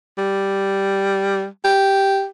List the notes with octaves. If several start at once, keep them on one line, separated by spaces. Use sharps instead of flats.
G3
G4